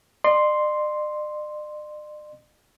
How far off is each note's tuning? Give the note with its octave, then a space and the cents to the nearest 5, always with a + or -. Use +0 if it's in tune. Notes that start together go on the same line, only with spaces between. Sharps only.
D5 +45 C6 +0